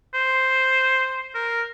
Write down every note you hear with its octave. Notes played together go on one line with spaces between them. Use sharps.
C5
A#4